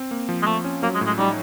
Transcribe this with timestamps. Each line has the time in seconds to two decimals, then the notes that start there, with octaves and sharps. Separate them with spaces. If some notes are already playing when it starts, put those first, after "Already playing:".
Already playing: C4
0.11 A#3
0.29 F3
0.43 G#3
0.47 F3 A3
0.64 C#4
0.83 F#3 A#3
0.95 G#3
1.01 A2
1.06 G#3
1.19 G3 D#4